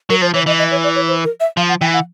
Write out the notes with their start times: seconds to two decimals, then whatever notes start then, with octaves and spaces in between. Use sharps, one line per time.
0.10 F#3 A#4
0.22 F3 C5
0.34 E3 C#5
0.46 E3 D#5
0.59 D#5
0.71 C#5
0.84 D5
0.95 C#5
1.08 C5
1.24 A#4
1.40 E5
1.57 F3 F5
1.69 F#5
1.81 E3 G5
1.93 F#5